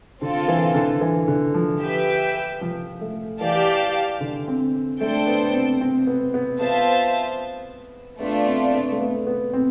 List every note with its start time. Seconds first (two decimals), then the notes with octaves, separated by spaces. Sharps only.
0.21 D3 C4 F4 A4
0.48 E3
0.75 D3
1.01 E3
1.28 D3
1.54 F3
1.81 G4 B4 E5 G5
2.61 F3
3.01 A3
3.40 E3 G4 D5 F5 A5
4.20 D3
4.48 C4
5.00 A3 D4 A4 C5 G5
5.27 B3
5.54 C4
5.81 C4
6.07 B3
6.34 B3
6.60 B3 F4 C5 E5 A5
8.20 A3 B3 D4 F4
8.47 C4
8.74 B3
8.91 A3
9.00 B3
9.27 B3
9.53 C4